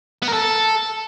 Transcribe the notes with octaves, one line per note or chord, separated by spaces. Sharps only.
B3
A#4
A4